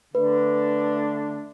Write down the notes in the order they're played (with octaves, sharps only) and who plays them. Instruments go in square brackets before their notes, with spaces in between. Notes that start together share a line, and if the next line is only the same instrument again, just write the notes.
[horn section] D3 A3 D4 [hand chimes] B4